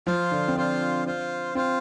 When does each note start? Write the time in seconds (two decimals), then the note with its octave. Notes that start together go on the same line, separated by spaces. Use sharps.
0.07 F3 F4 C5 F5
0.31 D3
0.48 C4
0.56 D4 F4 C5 F5
1.06 F4 C5 F5
1.55 C4 F4 C5 F5